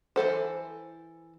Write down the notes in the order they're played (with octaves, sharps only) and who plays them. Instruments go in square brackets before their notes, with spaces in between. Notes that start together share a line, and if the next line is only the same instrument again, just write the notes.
[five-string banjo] E3 F#3 A4 C5